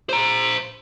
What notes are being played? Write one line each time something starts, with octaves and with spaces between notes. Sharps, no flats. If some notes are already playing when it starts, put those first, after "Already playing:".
C5 A#5